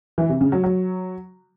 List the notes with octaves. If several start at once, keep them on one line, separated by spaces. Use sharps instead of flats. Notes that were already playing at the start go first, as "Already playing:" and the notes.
E3
C3
C#3
F#3
F#3